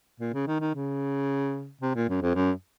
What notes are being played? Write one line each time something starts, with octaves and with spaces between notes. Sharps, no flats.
A#2
C#3
D#3
D#3
C#3
C3
A#2
F#2
F2
F#2